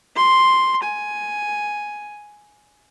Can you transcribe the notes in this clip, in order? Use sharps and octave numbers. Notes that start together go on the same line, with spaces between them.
C6
G#5